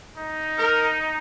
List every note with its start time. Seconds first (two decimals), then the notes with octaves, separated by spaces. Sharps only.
0.18 D#4
0.58 A#4